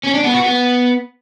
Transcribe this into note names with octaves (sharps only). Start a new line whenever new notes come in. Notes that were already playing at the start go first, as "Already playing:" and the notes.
C#4
D4
B3
F#4
B3